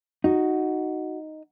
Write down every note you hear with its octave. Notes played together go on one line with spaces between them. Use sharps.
D#4 F#4